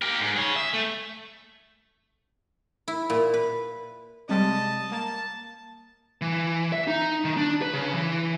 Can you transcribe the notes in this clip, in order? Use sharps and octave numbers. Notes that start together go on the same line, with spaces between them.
G4 A#4
G#2
G#4 C#5
E5
A3
E4
A#2
B4
C3 G3 G#3 D#5 A5
A#3 A5
E3
E5
D#4
D#3
D4
B4
C#3
E3